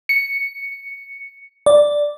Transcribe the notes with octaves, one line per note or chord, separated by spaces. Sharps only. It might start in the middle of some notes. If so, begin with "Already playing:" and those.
C#7
D5